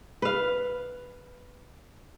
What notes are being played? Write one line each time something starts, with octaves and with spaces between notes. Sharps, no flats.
B4 F5